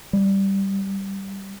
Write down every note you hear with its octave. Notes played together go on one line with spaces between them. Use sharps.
G3